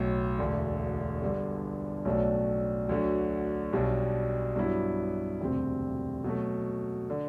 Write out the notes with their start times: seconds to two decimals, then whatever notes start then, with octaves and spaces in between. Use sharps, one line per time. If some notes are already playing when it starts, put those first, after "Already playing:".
Already playing: B1 A2 F#3
0.39 E1 D2 D3
1.22 G1 G2 D3
2.05 B1 A2 F#3 A3 D4
2.89 D2 D3 F#3
3.73 B1 B2 G3 D4
4.56 G2 F#3 B3 E4
5.40 E1 D2 C3 G3 C4
6.24 B2 F#3 A3
7.10 D3